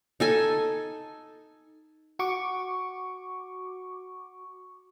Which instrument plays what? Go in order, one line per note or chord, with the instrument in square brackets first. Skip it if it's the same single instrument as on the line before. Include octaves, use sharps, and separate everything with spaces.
[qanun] D#4 A4 G#5
[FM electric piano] F#4 C#6 D6